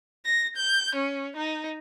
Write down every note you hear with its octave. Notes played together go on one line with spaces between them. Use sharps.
A#6
G6
C#4
D#4